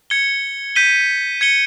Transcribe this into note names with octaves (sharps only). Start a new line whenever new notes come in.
G#6 C#7 G7
G6 B6 D#7 G7
G#6 C#7 G7